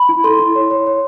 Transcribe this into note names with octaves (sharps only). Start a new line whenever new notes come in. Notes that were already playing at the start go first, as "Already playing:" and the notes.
Already playing: B5
E4
A4 C6
E4
C#5
C#5
C#5